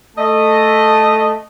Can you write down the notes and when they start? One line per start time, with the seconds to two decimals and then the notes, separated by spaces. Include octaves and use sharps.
0.17 A3 D#5